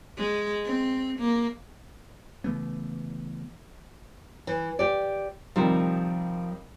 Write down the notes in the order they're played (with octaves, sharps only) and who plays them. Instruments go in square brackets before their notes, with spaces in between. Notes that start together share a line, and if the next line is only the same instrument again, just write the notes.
[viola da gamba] G#3
C4
A#3
[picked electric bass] C#3 E3 A3 B3
[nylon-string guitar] E3
G4 D5
[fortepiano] C3 D#3 G3 [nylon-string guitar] F3